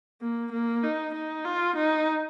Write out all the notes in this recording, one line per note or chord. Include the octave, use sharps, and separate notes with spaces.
A#3
A#3
D#4
D#4
F4
D#4